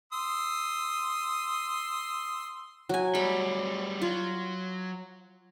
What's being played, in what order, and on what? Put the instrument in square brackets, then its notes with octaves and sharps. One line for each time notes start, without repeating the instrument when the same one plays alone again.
[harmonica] C6 D#6 E6
[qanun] F#3 G#5
[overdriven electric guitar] G3 A3 [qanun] B5
[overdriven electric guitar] F#3 [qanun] F4